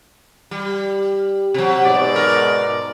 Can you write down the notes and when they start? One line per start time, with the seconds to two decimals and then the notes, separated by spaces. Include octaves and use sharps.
0.51 G3
1.54 C3 F#3
1.85 G#2 B2 D5
2.16 A#4